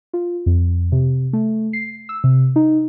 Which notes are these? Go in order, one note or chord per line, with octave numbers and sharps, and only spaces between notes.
F4
F2
C3
A3
C7
E6
C3
D#4